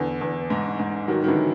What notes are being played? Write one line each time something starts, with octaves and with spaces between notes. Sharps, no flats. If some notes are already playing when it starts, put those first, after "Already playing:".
Already playing: E2 D3
E2
G#2
G#2
D#3 F#3
D#3
D3 E3
F#3